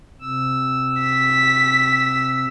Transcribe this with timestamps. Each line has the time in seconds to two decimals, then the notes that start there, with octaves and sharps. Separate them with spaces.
0.21 C3 E6
1.03 B6